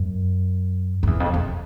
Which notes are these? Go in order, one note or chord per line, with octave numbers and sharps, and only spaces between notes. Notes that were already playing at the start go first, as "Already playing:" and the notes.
Already playing: F#2
F2
E2
F2
F2